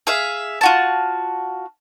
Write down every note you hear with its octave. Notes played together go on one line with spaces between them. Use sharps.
G#4 E5 F5
F4 F#4 A5